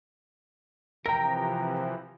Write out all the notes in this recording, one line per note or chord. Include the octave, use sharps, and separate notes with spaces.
C3 E3 F3 A#4 G5 A#5 A#6